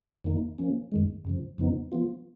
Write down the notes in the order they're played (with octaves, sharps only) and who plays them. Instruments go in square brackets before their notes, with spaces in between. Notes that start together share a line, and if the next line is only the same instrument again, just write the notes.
[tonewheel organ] F2 D#3 A#3 D#4
F3 A#3 C#4
F#2 D#3 G#3
F#2 C#3 F3
F2 C#3 F3 B3 D#4
F3 B3 F4